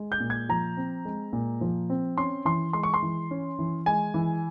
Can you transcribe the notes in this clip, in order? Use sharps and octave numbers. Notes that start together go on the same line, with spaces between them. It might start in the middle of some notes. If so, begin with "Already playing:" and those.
Already playing: G#3
G6
A#2
G#6
F3 A#5
C4
G#3
A#2
F3
C4
C#4 C6
E3 C6
G#3 C6
C#6
C6
E3
C#4
E3
G#3 G#5
E3